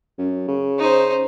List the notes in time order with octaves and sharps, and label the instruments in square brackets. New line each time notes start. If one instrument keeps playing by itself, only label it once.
[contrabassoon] F#2
C#3
[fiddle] D#4 C5